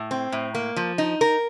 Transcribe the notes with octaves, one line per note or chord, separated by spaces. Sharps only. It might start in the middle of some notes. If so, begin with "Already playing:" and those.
Already playing: A2
C4
A2
A#3
F3
D#4
A#4